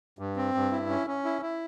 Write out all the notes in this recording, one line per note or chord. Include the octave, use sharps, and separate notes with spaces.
G2
C4
G2
E4
C#4
C#4
E4
E4